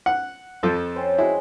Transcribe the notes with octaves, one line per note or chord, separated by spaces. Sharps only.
F#5
F2 F3 A4
C4 C#4 C5
G#3 E4 F#4 C6